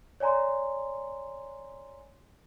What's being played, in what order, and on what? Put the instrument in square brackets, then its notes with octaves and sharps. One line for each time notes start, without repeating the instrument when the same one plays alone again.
[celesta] C#5 D5 G#5 A#5 C6